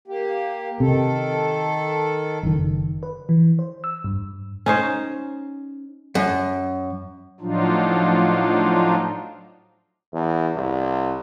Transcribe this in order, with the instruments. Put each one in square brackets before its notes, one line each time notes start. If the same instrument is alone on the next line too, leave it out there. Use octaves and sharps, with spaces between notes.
[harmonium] A#3 G4
[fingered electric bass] C3 [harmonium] D#3 A4
[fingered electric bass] F#1 D#3
[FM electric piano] B4
E3
C5
E6
G2
[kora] C#4 D#4 C5
[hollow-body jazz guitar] F#2
[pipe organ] A2 F3 F#3 D4 D#4 F4
[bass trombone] E2
C2